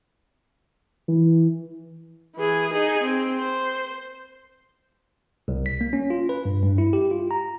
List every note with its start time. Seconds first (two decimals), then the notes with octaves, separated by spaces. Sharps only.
1.08 E3
2.36 E3 G#4
2.72 D#4 G#4
3.03 C4
3.39 C5
5.48 C2
5.66 B6
5.81 A#3
5.93 C#4
6.10 F4
6.29 B4
6.45 G2
6.63 G2
6.78 E4
6.93 G4
7.11 F4
7.31 A#5